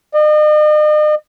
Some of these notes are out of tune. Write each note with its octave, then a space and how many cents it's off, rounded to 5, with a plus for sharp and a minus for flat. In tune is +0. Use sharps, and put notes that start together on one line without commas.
D#5 -45